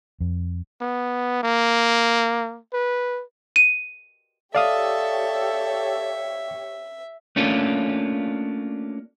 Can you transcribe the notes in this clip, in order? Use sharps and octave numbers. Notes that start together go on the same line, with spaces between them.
F2
B3
A#3
B4
D#7
G4 A4 C#5 D5 E5 F5 D#6
A3 A#3 C#4 D4 F4